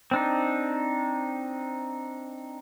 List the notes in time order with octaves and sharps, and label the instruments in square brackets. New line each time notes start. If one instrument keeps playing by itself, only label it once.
[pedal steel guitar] C4 D4 D#4